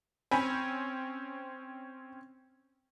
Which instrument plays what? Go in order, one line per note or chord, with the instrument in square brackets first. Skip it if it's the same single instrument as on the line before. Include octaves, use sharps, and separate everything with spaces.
[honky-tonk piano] C4 C#4 [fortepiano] G#5 B5